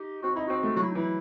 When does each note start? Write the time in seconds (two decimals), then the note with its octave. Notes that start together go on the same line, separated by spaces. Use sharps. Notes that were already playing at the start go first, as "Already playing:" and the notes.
Already playing: D#4 G4
0.22 C4 F#4
0.35 D#4 E4
0.47 C4 F#4
0.63 A3
0.76 F#3 F#4
0.83 E4
0.92 D#4
0.95 E3 E4